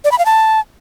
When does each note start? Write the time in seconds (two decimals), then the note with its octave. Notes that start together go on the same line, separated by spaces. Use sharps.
0.05 D5
0.11 B5
0.18 F5
0.25 A5